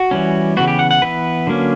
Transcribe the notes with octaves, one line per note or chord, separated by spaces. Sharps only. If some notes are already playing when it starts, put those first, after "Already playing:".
Already playing: F#4
E3 G3 C#4
C#3 E3 B3 F#4
G4
F#5
F#5
E3 B3 B4
D3 F#3 A#3 C#4